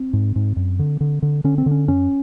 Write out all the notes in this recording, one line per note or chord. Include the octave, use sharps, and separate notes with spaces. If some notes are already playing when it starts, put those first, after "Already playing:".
Already playing: C4
G#2
G#2
F#2
D3
D3
D3
D3 C#4
C4
D3
C#4
F#2 C#4